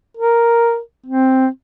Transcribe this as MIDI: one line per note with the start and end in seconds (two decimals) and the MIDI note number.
0.17 0.79 70
1.06 1.47 60